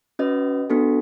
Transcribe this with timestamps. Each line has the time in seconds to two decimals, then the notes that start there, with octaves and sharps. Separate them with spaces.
0.19 C#4 F#4 B4 D#5
0.70 B3 D4 F#4 A4